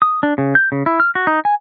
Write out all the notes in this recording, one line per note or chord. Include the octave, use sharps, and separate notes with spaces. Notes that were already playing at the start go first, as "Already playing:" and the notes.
D#6
D4
C#3
G6
C#3
E4
F6
F#4
D#4
G#5